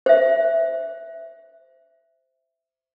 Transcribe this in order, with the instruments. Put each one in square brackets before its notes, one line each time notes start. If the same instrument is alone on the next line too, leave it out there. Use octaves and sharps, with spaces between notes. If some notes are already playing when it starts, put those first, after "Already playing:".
[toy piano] C5 E5